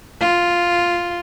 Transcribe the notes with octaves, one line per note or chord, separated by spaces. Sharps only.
F4